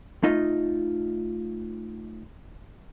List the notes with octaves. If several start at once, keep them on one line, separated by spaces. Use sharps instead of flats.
A3 D#4 F4 D#5